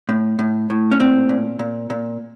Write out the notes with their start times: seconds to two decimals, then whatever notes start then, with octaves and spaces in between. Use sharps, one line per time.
0.09 A2
0.39 A2
0.70 A2
0.91 C#4
1.00 A#2 C4
1.29 A#2
1.59 A#2
1.90 A#2